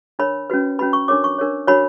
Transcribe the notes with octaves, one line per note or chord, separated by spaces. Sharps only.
D4 A#4 C#5 B5
C#4 F#4 B4
C#4 F#4 B4 B5
C#6
D4 A#4 C#5 D6
C#6
D4 A#4 C#5
D4 F#4 A#4 C#5 B5